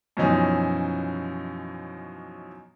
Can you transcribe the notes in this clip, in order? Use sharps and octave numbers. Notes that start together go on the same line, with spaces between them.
F#2 B2 E3 F3 C#4 D#4